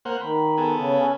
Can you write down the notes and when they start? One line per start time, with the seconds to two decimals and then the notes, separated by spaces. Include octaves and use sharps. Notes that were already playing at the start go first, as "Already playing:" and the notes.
0.05 A#3 C5 F#5
0.21 D#3 B5
0.58 B3 G#4 A4
0.76 C#3
0.97 C#4